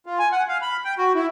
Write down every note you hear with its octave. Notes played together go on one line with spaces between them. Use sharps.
F4
G#5
F#5
F5
B5
G5
F#4
E4